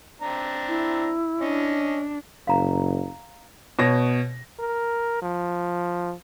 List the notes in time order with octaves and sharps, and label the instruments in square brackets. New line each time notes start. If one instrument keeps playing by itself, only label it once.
[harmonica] C4 D4 A#5
[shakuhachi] E4
[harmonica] C#4 D#5 [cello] D4
[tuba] F#1 [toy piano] F5 A#5
[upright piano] B2 C#5 A#6
[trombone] A#4
F3